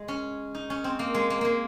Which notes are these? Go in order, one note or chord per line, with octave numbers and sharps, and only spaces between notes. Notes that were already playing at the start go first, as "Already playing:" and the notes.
Already playing: G#3
C#4
D#4
C#4
C4
A#3
G#3
A#3
G#3 A#3